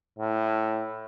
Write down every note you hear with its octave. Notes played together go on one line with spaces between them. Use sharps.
A2